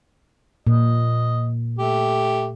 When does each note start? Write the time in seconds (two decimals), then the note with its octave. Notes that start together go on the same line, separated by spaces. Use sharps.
0.67 A#2 D#5
1.78 A3 G4